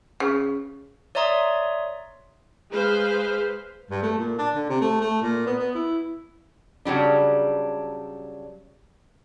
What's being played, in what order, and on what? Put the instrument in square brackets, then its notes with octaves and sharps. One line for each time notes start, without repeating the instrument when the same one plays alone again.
[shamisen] C#3
[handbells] C#5 D5 E5 A#5 C6 D#6
[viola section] G#3 B4 C5 F5
[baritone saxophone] G2
A3
A#2
D4
D3
C3
A3
A3
A#2
B3
B3
E4
[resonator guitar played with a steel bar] C#3 F#3 G3 D4